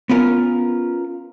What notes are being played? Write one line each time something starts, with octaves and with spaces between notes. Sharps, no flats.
B3 C#4 F4 A#4